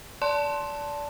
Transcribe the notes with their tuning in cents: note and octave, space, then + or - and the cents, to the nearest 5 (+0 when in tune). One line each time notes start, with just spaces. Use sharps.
D5 -25 A5 +0 C6 +10